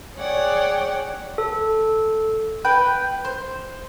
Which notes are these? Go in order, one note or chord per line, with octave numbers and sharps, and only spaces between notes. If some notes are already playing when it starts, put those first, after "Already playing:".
G#4 C#5 D5 F#5 G5
A4
B4 G5
C5